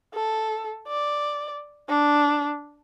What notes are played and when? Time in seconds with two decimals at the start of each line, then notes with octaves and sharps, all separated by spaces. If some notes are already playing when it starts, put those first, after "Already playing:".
0.14 A4
0.88 D5
1.89 D4